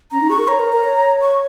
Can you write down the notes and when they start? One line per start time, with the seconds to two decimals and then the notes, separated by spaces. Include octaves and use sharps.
0.11 C#4 A#5
0.21 D#4
0.30 G#4 C#6
0.39 A#4
0.48 C#5 A#5
0.59 A#4
0.72 A#4
0.84 C#5
1.21 C#6